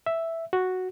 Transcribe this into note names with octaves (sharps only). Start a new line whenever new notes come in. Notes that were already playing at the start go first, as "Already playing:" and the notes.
E5
F#4